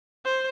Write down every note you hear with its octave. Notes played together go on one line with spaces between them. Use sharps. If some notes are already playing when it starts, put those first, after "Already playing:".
C5